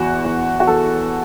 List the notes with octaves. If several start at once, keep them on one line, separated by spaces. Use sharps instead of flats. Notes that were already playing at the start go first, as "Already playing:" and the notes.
Already playing: E2 F#4
E2
F#4
E3 A4